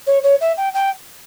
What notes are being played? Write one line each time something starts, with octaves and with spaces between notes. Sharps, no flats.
C#5
C#5
E5
G5
G5